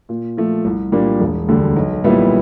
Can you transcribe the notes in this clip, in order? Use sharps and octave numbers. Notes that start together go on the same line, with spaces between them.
A#2
F3 A3
C2
A#2 G3 A#3 D4
E1
D2 D3 G3
B1
A#2 G3 B3 E4